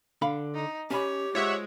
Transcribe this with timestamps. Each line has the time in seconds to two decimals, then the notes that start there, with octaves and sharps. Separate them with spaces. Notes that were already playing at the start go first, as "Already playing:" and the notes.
0.22 D3 F5 B5
0.54 D#4
0.91 C#4 G4 C#5 G#5 B5
1.35 G#3 F4 C5 C#5 E5 F#5